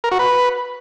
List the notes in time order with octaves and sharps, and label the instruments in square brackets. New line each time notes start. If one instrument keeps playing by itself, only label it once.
[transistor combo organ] A#4
F#4
B4